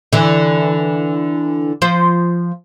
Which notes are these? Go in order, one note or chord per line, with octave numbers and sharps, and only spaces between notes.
D3 E3
F3 C5